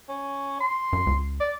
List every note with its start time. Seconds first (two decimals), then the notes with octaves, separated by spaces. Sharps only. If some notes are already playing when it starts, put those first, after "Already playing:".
0.09 C#4
0.60 C6
0.93 F#2
1.07 C#2
1.40 D5